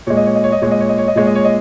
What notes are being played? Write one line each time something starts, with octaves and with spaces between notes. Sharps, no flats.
A#2 G#3 C#5
D#5
C#5
D#5
C#5
D#5
A#2 G#3 C#5
D#5
C#5
D#5
C#5
D#5
A#2 G#3 C#5
D#5
C#5
D#5